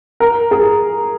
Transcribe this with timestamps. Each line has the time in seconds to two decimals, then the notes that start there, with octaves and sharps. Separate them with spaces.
0.20 A#4
0.51 G#4